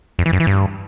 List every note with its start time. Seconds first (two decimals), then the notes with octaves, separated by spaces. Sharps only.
0.19 F2
0.26 E3
0.33 F#2
0.40 E3
0.47 G2